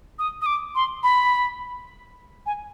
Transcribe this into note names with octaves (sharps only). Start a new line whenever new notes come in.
D#6
D#6
D6
C6
B5
G#5